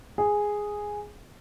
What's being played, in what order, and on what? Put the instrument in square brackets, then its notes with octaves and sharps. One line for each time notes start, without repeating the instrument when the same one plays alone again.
[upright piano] G#4